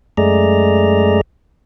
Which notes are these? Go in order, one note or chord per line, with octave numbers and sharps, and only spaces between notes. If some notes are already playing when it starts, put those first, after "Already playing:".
F#2 G#3 A3 G#4 D5 A#5